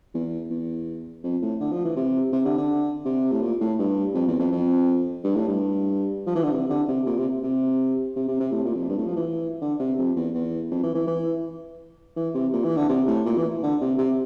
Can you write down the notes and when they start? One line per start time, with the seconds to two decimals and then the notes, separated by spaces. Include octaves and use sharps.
0.14 E2
0.50 E2
1.24 F2
1.42 A2
1.61 D3
1.72 F3
1.85 E3
1.96 C3
2.32 C3
2.45 D3
2.58 D3
3.05 C3
3.32 A2
3.42 A#2
3.61 A2
3.79 G2
4.14 F2
4.27 E2
4.39 F2
4.52 F2
5.24 G2
5.36 A2
5.48 G2
6.27 F3
6.35 E3
6.43 D3
6.52 C3
6.70 D3
6.88 C3
7.06 A#2
7.18 C3
7.43 C3
8.16 C3
8.28 C3
8.40 C3
8.52 A2
8.65 A#2
8.76 F2
8.89 G2
8.98 A2
9.07 F3
9.16 E3
9.61 D3
9.80 C3
9.98 F2
10.16 E2
10.34 E2
10.71 F2
10.83 E3
10.95 E3
11.07 E3
12.16 E3
12.34 C3
12.53 A#2
12.65 E3
12.77 D3
12.89 C3
13.08 A2
13.26 A#2
13.37 E3
13.63 D3
13.81 C3
13.98 C3